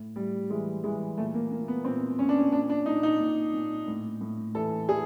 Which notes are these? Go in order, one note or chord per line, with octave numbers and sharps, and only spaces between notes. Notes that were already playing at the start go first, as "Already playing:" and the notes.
Already playing: A2
A2 G3
E3 G#3
E3 G#3
A#2 A3
A#3
A#2 A#3
B3
A#2 C4
A#2 C#4
D4
C#4
A#2 D4
D4
A#2 D#4
D#4
A#2
A#2
A2
A2
E3 A4
E3 G#4